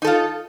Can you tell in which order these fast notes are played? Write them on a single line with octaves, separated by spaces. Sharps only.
D#4 A4 F4